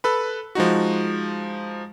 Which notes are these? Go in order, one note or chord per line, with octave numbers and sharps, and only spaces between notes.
A4 B4 B5
F3 G#3 D#4 F#4